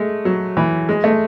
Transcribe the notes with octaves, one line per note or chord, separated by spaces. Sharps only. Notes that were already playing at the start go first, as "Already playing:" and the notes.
Already playing: G#3 A3
F#3
E3
G#3
A3